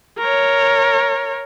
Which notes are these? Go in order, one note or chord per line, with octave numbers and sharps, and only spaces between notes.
A#4 C#5